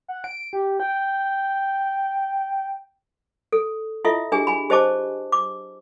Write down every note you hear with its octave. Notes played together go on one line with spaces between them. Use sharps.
F#5
D7
G4
G5
A4
E4 F4 A4 D#5 E5
D4 G4 G#4 G#5
G#5 B5
G4 C5 D#5 A5 D6
D6